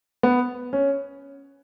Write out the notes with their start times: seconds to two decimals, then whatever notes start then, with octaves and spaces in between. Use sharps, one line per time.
0.23 B3
0.73 C#4